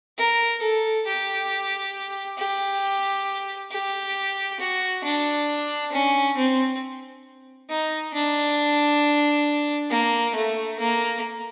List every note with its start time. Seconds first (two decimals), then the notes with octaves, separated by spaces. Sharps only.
0.18 A#4
0.62 A4
1.07 G4
2.38 G4
3.72 G4
4.60 F#4
5.04 D4
5.93 C#4
6.37 C4
7.70 D#4
8.14 D4
9.90 A#3
10.35 A3
10.79 A#3